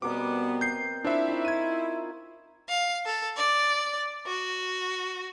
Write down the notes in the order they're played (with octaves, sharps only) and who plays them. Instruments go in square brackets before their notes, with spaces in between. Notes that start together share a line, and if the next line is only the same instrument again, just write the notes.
[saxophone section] B2 G3 B3 [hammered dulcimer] C4 A#4 D#5 [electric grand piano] D6
[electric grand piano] G6 C7
[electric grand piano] D4 C5 E5 [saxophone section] E4 [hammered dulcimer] F4 G5
[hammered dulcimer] D#4 C#6
[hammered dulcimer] F4 [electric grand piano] G#6 D#7
[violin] F5
A4
D5
F#4